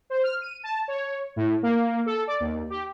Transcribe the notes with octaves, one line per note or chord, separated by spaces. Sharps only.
C5
F6
D#7
A5
C#5
A2
A#3
A4
D5
D#2
G4